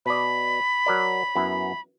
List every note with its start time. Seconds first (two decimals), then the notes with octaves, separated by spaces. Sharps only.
0.06 B2 D5 B5
0.86 F#3 A#4 D5
1.35 F#2 B3 E4